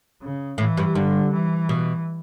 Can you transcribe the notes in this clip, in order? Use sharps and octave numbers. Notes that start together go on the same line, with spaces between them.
C#3
A2 E3
G2
G2 D3
E3
B2